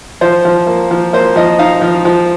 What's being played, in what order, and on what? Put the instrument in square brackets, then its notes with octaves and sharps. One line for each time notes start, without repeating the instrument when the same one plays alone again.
[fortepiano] F3 C5
F3
A#3
F3
A#3 C5
F3 D#5
D#4 F5
F3
F3